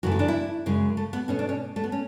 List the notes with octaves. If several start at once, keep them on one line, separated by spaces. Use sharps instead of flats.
F#2 C#3 E3 A3 F#4
E4
D4
E4
F#2 C#3 G#3
A3
B3
B2 A3 C#4
D4
C#4
A3
B3
C#4